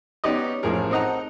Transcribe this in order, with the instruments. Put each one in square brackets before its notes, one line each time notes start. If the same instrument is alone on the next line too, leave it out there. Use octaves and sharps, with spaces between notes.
[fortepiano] B3 C#4 D#4 G4 D5 D#5
A1 A2 F3 G#4 A#4
C4 D#4 A4 D#5 F#5 A#5